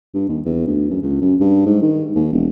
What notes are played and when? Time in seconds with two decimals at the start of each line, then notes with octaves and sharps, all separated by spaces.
0.14 G2
0.29 D#2
0.45 E2
0.67 D2
0.90 F#2
1.02 C#2
1.22 F#2
1.40 G2
1.66 G#2
1.82 D#3
2.15 D#2
2.32 E1